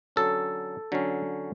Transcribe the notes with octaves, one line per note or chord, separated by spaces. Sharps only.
D3 F#3 C#4 A4
D3 F#3 C#4